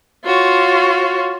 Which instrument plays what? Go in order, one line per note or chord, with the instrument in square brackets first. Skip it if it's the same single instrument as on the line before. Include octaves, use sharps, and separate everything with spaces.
[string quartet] F4 F#4 C#5